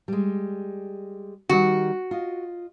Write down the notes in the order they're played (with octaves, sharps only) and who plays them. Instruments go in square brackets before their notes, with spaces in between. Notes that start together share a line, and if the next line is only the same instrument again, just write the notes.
[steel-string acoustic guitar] G3 G#3
[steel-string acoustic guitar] D#3 G3 F#5 [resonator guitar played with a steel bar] F#4
[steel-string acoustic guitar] F4 D#5